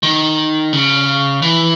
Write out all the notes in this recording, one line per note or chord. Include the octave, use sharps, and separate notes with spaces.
D#3
C#3
E3